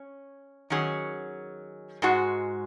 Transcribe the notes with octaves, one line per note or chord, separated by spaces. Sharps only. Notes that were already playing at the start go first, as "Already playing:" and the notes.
Already playing: C#4
D#3 F#3 C#4 G#4
G#2 G#3 F#4